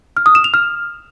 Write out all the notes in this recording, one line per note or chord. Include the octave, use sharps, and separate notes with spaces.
F6
D#6
E7
F7
F6